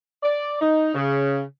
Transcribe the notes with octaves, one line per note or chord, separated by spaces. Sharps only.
D5
D#4
C#3